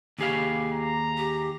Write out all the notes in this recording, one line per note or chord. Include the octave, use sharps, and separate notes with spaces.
D#2 G4 G#4 F5
A#5
G4